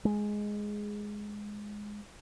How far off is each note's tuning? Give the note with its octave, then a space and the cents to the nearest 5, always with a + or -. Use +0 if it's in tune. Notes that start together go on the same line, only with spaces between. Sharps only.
G#3 +0